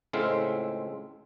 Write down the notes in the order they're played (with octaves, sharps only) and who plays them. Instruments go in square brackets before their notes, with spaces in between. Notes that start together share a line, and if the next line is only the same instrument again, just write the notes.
[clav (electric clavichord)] C#2 A2 G#3 C4 E5 F5